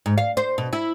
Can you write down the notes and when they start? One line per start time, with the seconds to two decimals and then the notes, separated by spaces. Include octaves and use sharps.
0.06 G#2
0.18 F5
0.37 C5
0.58 B2
0.73 E4